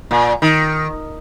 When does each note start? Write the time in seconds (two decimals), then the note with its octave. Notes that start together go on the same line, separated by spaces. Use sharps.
0.11 A#2
0.42 D#3